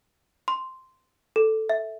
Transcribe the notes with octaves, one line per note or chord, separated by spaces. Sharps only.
C6
A4
E5